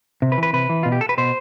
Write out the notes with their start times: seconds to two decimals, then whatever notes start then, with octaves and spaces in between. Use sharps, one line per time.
0.22 C3
0.32 B4
0.38 E3
0.43 B4
0.53 C3 B4
0.69 E3
0.83 B2 F4
0.92 G4
1.01 A4
1.09 B4
1.18 B2 C5